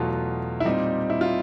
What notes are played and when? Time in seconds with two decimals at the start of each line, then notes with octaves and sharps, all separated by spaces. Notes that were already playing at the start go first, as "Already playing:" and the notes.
Already playing: E2 B2 F#3 A3 F4
0.60 E4
0.65 A#2 G3 C4 D#4
1.10 E4
1.21 F4